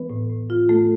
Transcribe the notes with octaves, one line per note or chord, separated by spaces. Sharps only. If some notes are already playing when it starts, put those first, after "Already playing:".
Already playing: E3 B3 B4
A2
A2
E3 F4
A2 A3 A4